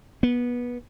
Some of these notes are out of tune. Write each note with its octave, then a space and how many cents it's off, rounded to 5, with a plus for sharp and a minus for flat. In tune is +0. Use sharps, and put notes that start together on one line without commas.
B3 -20